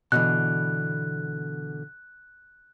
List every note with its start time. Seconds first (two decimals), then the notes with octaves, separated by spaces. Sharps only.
0.12 B2 D3 E3 F#6